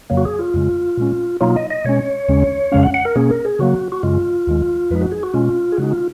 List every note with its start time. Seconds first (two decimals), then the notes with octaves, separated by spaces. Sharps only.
0.10 F2 C#3 F#3 A#3
0.17 F#4
0.25 G#4
0.39 F4
0.54 F2 C#3 G#3
0.97 A#2 G#3 C#4
1.41 B2 F#3 A#3 D#4 F4
1.56 D#5
1.70 D#5
1.85 B2 G#3 C#4 C#5
2.29 D#2 C#3 G#3 C#4
2.72 F2 C#3 G#3 C#4 F5
2.83 F#5
2.94 F#5
3.05 A#4
3.16 B2 A#3 C#4 G#4
3.31 A#4
3.45 G#4
3.59 C#3 F#3 A#3 F#4
3.92 F#4
4.03 F#2 C#3 G#3 F4
4.47 D#2 D#3 G#3
4.90 F2 F3 G#3 D#4 B4
5.01 F#4
5.12 G#4
5.23 F#4
5.34 B2 G#3 C#4 F4
5.72 G#4
5.78 C#3 G#3 D#4 F#4
5.92 F4